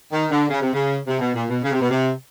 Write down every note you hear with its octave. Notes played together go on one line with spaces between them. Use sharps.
D#3
D3
C#3
C3
C#3
C3
B2
A#2
B2
C#3
C3
B2
C3